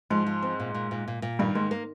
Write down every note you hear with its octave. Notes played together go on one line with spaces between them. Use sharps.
G#2 F3
F3
C4
A#2
A#2
A#2
A#2
A#2
G2 D#3
G#2 A#3
A#3